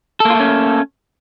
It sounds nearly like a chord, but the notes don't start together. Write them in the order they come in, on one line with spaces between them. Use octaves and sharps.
A4 A#3 F4 A3 C#4